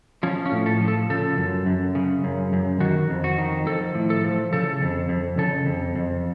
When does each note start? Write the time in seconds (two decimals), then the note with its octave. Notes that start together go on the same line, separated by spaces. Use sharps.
0.23 F3 C#4
0.46 C#4
0.52 A2
0.66 A4
0.81 F3
0.88 A4
1.10 C#3 A4
1.37 F#2
1.66 F#2
1.95 C#3
2.24 F#2
2.53 F#2
2.80 D#3 F#4
3.10 F2
3.24 F#4
3.38 D#3
3.66 F3 A4
3.95 A2
4.10 A4
4.24 F3
4.53 C#3 A4
4.82 F2
5.09 F2
5.38 C#3 A4
5.66 F2
5.95 F2